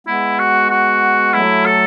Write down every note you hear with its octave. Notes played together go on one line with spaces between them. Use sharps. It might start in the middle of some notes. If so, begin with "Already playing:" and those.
G#3 B3 E4
F#4
F#4
F#3 A3 E4
A4